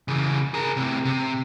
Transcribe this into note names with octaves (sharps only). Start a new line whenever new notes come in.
C#3 E3
G#4 A#4
A2 C3
C3